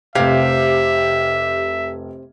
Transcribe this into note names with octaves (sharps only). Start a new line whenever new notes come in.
F1 C3 G4 E5 F5 G#6